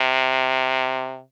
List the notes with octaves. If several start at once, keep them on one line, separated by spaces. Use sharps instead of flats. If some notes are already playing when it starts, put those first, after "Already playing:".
Already playing: C3